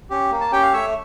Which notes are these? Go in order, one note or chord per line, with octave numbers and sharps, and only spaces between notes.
C#4 G4
A#3
A5
C#4 G4 G5
F5
A3 C#5 E5